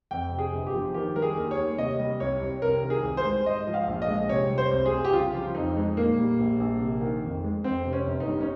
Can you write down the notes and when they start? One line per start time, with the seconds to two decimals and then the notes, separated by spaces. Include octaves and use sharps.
0.11 F2 G5
0.32 C3
0.39 G#4
0.53 G1
0.67 G4
0.74 F3
0.94 D#3 G4
1.16 G3 A#4
1.22 G#4
1.36 D#2
1.51 C#5
1.58 D#2
1.78 C3 D#5
1.99 G3
2.20 C2 C#5
2.41 C2
2.62 C3 A#4
2.83 D#3
2.90 G#4
3.03 C2
3.17 C5
3.25 G#3
3.45 G#2 D#5
3.67 F3
3.74 F5
3.88 A#1
4.02 D#5
4.08 G#3
4.29 C3 C#5
4.50 G3
4.58 C5
4.71 C2
4.86 G#4
4.92 C2
5.05 G4
5.13 C#3 F4
5.35 F3
5.55 F2 D#4
5.77 G#3
5.97 A#2 A#3
6.18 G3
6.39 A#1
6.59 A#1
6.80 C3
7.01 D#3
7.23 F2
7.44 G#3
7.64 F2 C4
7.85 C3
7.93 C#4
8.06 G1
8.20 D#4
8.27 G3
8.41 C#4